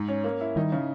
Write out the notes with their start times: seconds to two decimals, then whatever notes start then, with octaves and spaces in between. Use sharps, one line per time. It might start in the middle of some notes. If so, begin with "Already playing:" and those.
Already playing: G#2
0.08 C#4
0.24 A#3
0.41 E4
0.56 D#3 G3 D#4
0.72 C#3